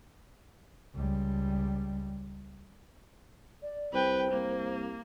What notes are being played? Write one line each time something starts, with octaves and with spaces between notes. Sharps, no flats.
C#2 G3
D5
C2 B4 C5 G5
C2 A#3